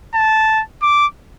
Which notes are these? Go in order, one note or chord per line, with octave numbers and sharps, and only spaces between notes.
A5
D6